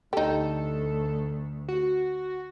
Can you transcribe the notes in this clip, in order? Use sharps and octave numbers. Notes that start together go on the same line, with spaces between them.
D2 D#4 G4 A4
F#4